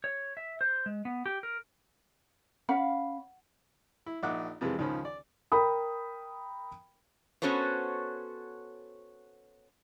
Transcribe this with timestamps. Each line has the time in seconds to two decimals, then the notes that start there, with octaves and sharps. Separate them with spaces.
0.04 C#5
0.37 E5
0.61 C5
0.86 G#3
1.05 B3
1.26 G4
1.43 A#4
2.69 C#4 F5 F#5 B5
4.06 E4
4.23 A#1 D#4 E5 F#5 D6 F#6
4.61 F2 C3 E3 G#3
4.79 C#2 D#3 F3 C#4 B5
5.05 D5
5.52 A#4 G5 B5 D#6
7.42 B3 C#4 F#4 A4 C5 C#5